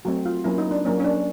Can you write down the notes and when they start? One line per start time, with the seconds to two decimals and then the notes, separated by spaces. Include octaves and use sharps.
0.05 F#3 A3 C4 F#4
0.26 F4
0.44 F#3 A#3 C#4 E4
0.58 D#4
0.71 D4
0.85 F#3 A#3 C#4
1.00 C#4
1.04 D4